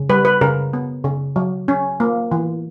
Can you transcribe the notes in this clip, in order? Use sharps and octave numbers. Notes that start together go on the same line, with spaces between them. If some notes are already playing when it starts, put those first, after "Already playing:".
Already playing: C#3
G3 B4
B4
C#3 A#4
B3
C#3
F#3
C#4
A#3
E3